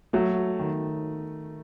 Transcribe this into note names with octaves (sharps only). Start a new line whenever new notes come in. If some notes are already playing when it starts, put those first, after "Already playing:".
F#3 A3
D#3